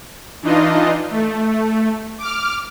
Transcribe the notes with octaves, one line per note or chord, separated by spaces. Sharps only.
E3 D4 D#4 F4 D#5
A3
D6 F6